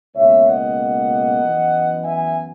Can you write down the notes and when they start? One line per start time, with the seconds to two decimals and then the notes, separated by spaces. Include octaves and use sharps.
0.16 C#2 B2 A#3 C#5 E5
0.47 D#5 F#5
1.42 F#2 E3 B3
2.05 E5 G#5